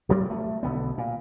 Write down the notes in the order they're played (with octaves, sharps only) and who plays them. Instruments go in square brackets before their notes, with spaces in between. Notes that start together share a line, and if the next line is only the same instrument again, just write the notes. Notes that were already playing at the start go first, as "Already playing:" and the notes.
[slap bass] D1 G2 F#3 G3
A3
B1 D3 B3
A#2